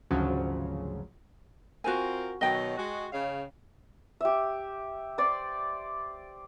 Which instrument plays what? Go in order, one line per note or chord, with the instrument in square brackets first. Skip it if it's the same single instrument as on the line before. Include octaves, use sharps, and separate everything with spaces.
[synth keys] G#1 D2 C#3 F3 F#3
[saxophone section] C4 F4 A#4 [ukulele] F#4 G#5
[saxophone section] B2 D#3 F#3 [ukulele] D#5 G5
[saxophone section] G#3 F#4
C#3 F5
[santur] G4 E5
C5 D5